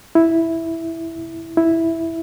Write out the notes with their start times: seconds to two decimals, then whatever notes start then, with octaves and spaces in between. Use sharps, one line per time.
0.15 E4
1.57 E4